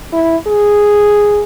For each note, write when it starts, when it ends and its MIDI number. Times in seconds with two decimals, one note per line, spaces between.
0.13 0.36 64
0.47 1.43 68